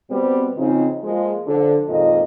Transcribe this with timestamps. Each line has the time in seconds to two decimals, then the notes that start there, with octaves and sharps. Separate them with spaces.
0.10 B2 G3 B3 C4
0.57 C#3 F3 C4 D#4
1.04 F3 G#3 A#3 F4
1.47 D3 F3
1.89 F2 A#2 D#3 G#3 D#5